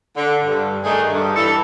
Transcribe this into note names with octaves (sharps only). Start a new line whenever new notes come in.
D3
G2
D#3 A3 D4 D#4 G#4
G2
E3 A4